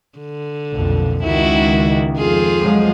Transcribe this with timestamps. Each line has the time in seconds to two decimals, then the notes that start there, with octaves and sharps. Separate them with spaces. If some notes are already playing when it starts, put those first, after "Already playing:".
0.18 D3
0.72 B1 F2 A#2
1.23 C#2 D#3 E4 F#4
2.17 F2 F4 G#4
2.60 F3 F#3 G#3